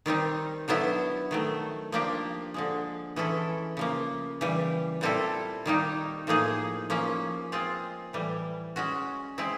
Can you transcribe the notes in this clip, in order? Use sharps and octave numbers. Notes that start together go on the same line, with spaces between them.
D#3 G3 C4 D#4
D3 F#3 B3 E4
D#3 F#3 A3
F3 A#3 D4 G4
D3 F3 G#3
E3 G#3 C#4 E4 A4
C#3 F3 A#3
C#3 E3 G3
A#2 G3 C4 E4 A4
D#3 G3 A#3 D#4
A2 F3 A#3 D#4 G#4
F3 A#3 C#4
G#3 C4 F4 G#4
A2 E3 G3
G#3 C#4 F#4
G#3 C4 E4